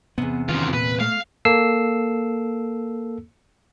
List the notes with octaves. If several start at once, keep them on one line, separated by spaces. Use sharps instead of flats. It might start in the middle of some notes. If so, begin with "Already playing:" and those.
E2 C3 B3
F#2 D#3 E3 F4
A#2 B4
A3 F5
A#3 A4 E6 C7